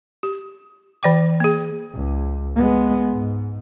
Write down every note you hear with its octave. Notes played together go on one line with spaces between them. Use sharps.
G4
E3 D5 G5 D6
A#3 G#4
C#2
G#3 B3
G#2